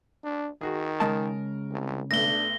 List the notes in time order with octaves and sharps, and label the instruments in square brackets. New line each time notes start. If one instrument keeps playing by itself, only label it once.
[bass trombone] D4
[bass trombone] D#3 [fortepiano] F#4 G#4
[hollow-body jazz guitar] C#3 G#3 A5 [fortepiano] A#4
[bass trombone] C2
[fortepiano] B1 A3 B4 [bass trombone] D4 [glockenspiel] A#6 G7